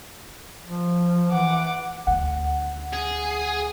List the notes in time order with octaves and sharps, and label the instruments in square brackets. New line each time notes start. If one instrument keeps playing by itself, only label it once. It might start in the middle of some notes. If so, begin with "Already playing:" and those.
[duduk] F3
[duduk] E3 [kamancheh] F#5 D6
[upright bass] D2 [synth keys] F#5
[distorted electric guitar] G#4